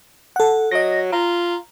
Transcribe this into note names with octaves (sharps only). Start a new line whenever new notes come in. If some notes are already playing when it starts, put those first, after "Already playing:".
A4 F#5
F#3 D#5 A#6
F4 A#5